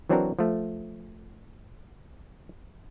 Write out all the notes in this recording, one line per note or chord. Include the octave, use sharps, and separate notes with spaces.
E3 F#3 C4 D4 F#4 A#4
F3 A3